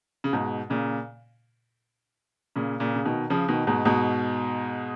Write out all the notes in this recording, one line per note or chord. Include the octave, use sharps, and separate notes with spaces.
C#3
G#2 B2
A#2 C#3
A#2 C#3
A#2 C#3
C#3
B2 D#3
C#3 F3
B2 D#3
G#2 B2
G#2 B2